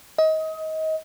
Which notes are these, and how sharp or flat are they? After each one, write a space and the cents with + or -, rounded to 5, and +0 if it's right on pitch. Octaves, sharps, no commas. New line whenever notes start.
D#5 +25